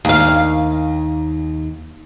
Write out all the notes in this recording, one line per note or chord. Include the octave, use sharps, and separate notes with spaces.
D#2 F5